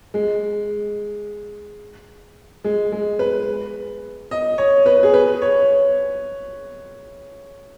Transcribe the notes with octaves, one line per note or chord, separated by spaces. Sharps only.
G#3
G#3
G#3
B4
D#5
C#5
B4
G#4
B4
C#5